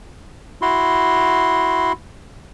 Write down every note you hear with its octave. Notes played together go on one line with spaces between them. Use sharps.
E4 F#4 C6